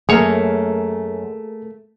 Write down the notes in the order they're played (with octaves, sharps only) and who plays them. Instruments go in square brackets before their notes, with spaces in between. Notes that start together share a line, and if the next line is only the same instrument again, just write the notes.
[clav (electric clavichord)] F#2 C#5 [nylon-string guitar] A3 A#3 [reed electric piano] G#4 A#4